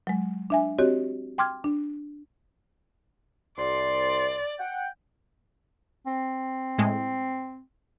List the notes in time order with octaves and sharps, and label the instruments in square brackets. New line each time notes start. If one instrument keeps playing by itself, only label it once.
[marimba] F#3 G#3
D4 E5 G#5
C4 F#4 G4 C#5 D#5
G5 C6 D6 F6 G#6
D4
[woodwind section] C2 C6 [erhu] D5
[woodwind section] F#5 G5
[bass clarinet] C4
[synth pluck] A2 G#3